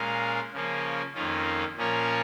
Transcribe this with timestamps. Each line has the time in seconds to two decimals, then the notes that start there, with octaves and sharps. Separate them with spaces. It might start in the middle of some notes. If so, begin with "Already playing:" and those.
Already playing: A#2 G#3 C#4 A#4 F5
0.53 C#3 F3 A#3 C#4
1.15 F2 D#3 A#3 C#4 F4
1.77 A#2 F3 C#4 A#4 C#5